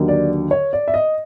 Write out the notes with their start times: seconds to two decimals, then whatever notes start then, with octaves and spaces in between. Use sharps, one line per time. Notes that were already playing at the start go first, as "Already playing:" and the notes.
Already playing: D#2 D3 F#3
0.08 D5
0.51 C#5
0.73 D5
0.88 E5
0.94 D#5